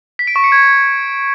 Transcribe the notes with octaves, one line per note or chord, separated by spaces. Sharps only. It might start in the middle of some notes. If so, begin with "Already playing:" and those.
B6
D7
C#6
C#7
G#6